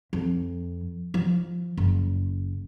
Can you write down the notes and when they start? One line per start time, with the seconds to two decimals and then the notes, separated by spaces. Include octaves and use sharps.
0.13 F2
1.14 F3
1.77 F#1